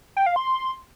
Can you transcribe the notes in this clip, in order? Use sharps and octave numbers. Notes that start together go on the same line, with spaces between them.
G5
F5
C6